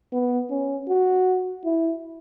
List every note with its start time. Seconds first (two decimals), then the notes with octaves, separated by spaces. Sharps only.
0.12 B3
0.50 C#4
0.88 F#4
1.65 E4